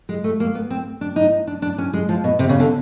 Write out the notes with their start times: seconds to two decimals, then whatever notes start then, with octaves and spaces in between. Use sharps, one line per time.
0.09 G#3
0.24 A3
0.40 A#3
0.55 B3
0.71 C4
1.01 D4
1.16 D#4
1.47 D4
1.62 D4
1.78 C#4
1.93 G#3
2.09 F3
2.24 B2
2.39 C3
2.49 C#3
2.60 D3